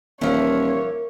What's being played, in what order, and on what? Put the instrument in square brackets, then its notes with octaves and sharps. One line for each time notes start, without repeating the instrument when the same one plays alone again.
[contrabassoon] D#1 [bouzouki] E3 F3 [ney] A#4 [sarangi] C#5